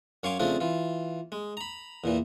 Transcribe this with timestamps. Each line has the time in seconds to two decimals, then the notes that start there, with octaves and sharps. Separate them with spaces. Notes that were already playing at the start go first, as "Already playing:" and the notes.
0.23 F#2 C#5 F5 G#5 C6 D6
0.40 C#3 F3 A3 C4 D4 F4
0.60 E3 F4
1.32 G#3
1.57 A#5 B5
2.04 E2 A#2 E3